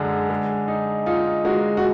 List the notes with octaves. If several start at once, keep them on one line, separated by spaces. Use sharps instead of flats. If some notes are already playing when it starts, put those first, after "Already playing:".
Already playing: F#2 D3 G#3
G#3
D#4
D#4 F4
G#3 F#4
F#4